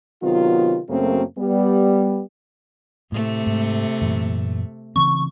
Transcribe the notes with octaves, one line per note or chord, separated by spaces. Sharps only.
C3 D#3 F#3 B3 F4
F#2 C#3 F#3 A3 A#3 C4
G3 B3
A2 C3 A3
G#2
F#2 A#2 E3
C#3 E3 C4 C#6